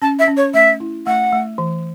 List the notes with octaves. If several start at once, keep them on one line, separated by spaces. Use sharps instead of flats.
C#4 A5
E5
C#4
C#5
A3 E5
E4
A3 F#5
A3
E3